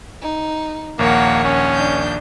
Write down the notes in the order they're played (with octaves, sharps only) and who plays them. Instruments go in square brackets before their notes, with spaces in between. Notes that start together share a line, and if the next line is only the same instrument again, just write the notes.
[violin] D#4
[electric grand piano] A#1 D#2 A#4 [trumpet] A#3 [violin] C#5 F#5
[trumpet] C#4
[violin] D4 G6